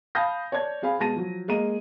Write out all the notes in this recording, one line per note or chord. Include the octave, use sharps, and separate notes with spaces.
F5 A5 B5 D#6 G6 A#6
C#5 D5 A5 G#6
C4 G#4 F5 G#5 B5
B2 G#3 A5 A#6 D#7
F3 F#3
G#3 A#3 D#5 A#5 D#7